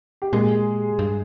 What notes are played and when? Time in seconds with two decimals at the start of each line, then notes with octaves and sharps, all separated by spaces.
0.22 G4
0.33 A#2 G#3 G#4
0.99 G2